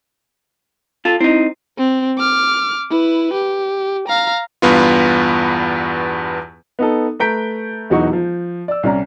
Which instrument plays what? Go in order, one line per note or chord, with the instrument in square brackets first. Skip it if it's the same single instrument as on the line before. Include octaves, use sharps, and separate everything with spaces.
[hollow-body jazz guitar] F4 A4
[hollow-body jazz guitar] C4 D#4 [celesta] E4
[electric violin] C4
D6 F6
E4 B4
G4
F5 A#5
[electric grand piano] E2 G2 B3 F4
[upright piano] B3 D#4 A4
A3 B4 A#5 G6 B6 D7
E1 E3 F#3 D#4 F#4 C#6
F3
D5 E6
C2 C#4 D5 A#5